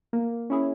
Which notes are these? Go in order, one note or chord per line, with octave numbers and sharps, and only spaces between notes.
A#3
C#4 E4 G#4